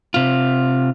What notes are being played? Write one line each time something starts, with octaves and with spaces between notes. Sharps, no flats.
C3 F4